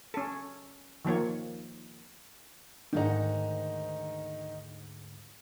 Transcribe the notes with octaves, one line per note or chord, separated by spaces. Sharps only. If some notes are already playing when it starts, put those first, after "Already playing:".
C#4 A4
D#3 F3 A#3 C#5
D2 G#2 D#3 D#4 F#5